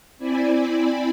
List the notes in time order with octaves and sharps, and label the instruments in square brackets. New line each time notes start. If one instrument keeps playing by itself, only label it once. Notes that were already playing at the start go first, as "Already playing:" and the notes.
[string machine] C4 E4 D5 G#5 B5